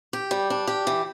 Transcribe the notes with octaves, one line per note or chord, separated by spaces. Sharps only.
G4
G3
D4
G4
E3